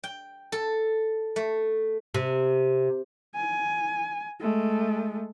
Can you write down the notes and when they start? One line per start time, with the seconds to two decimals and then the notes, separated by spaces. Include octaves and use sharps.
0.04 G5
0.52 A4
1.36 A3
2.14 C3
3.35 G#5
4.41 G#3 A3